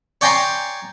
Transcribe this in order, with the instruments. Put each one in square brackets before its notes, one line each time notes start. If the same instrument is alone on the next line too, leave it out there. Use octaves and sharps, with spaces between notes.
[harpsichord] C#5 D5 G5 G#5 A#5 C6